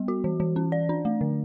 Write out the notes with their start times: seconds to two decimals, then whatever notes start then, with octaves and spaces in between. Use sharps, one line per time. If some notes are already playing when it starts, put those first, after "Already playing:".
Already playing: G3 B3
0.08 F#4
0.24 E3
0.40 E3
0.56 C#4
0.72 D5
0.89 D4
1.05 A3
1.21 D3